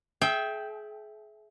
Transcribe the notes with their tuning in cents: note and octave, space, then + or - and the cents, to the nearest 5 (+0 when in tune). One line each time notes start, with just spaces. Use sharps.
G#4 +35 E5 +0 G5 +0